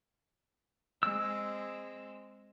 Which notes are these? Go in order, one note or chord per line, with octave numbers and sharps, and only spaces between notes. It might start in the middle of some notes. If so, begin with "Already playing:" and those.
G#3 C4 E6